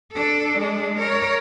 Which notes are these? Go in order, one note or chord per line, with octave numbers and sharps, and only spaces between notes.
D4 A4
G#3 D4
A#4 C#5